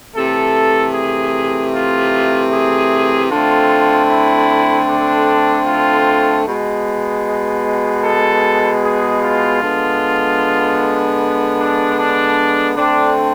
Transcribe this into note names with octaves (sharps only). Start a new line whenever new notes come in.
C3 E3 A3 A4
G#4
F4
G#4
D3 A3 C4 F4
E4
D4
F4
B2 G#3 B3
A4
G#4
F4
D3 G#3 B3
D4
D4
D3 A3 C4 D4